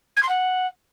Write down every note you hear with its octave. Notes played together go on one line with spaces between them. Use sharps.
G#6
C6
F#5